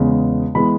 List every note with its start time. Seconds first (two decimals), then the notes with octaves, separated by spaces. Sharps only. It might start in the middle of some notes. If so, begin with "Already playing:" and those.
Already playing: E2 C#3 G#3 B3
0.55 E3 G#3 B3 B5